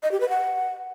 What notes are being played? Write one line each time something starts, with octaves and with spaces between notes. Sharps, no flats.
D#5
G4
B4
F#5